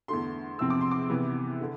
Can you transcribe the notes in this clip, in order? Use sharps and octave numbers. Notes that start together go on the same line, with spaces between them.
E2 D3 A3 C6
E2 C3 F3 C4 E6
D6
C6
D6
C3 E3 B3
D3